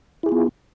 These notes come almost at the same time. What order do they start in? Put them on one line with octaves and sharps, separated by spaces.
E4 G#4 F4 B3